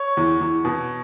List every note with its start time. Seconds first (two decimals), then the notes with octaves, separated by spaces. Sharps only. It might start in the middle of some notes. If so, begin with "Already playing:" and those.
Already playing: C#5
0.17 E2
0.41 E2
0.65 B2